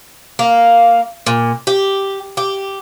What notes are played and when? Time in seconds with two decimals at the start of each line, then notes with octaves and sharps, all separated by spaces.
0.39 A#3
1.26 A#2
1.67 G4
2.37 G4